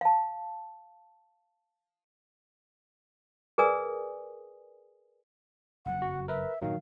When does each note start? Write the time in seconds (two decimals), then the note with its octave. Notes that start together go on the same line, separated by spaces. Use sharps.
0.01 F5 A5
3.58 G#4 A#4 B4 D5 G#5 D#6
5.86 F#1 F2 F#3 F#5
6.02 F#4
6.28 A#4 B4 E5
6.62 G2 A#2 D#3 F#3 F5